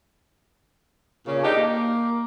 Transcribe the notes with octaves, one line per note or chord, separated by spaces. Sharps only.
A#2 C#3
D4 D#4 G4
A#3